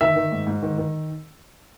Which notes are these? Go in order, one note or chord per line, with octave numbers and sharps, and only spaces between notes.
D#3 E5
D#3
G#2
G#2
D#3
D#3